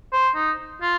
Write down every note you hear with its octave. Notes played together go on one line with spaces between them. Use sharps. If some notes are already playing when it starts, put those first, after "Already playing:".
C5
D#4
F4